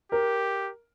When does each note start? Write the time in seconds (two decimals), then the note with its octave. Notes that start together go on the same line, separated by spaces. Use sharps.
0.12 G4 A#4